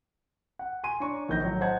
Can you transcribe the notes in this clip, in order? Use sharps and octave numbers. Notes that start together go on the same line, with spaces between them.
F#5
G#5 C6 D#7
D4 C#5 A#5 C#6
A#1 D#3 G6 A#6
A2 F#3 C#5
C5 D#5 F#5 A5 G#6